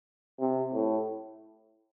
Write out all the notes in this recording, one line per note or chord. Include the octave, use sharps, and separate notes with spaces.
C3
A2